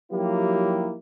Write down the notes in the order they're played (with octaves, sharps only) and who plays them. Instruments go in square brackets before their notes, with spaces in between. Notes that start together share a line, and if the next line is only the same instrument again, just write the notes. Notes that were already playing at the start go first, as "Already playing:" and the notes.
[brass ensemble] F3 F#3 A#3 D#4 E4 G4